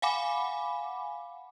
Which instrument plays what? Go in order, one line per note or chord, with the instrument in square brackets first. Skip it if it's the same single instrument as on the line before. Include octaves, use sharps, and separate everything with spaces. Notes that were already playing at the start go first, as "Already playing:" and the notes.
[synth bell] F5 F#5 G#5 B5 D6